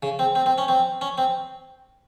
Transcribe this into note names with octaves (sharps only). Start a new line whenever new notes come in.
C#3
C4
C4
C4
C#4
C4
C#4
C4